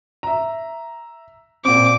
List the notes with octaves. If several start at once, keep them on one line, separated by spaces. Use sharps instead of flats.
E5 A#5
A#2 C4 D6